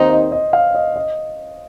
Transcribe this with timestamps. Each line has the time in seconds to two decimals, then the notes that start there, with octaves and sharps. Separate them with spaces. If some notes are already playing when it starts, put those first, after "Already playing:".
Already playing: D#2 D#3 C4 D#4 C5
0.10 D#5
0.32 D#5
0.53 F5
0.75 D#5
0.96 D#5